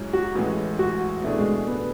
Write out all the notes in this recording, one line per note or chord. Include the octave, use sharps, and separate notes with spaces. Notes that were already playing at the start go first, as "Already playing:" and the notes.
Already playing: G#2 F#3 C#4 E4 G#4
F#4
A1 A2 E3 G#3
F#4
B2 A3 D4 E4 G#4
G#3
B3